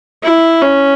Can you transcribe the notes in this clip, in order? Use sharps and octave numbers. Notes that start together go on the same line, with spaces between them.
E4
C#4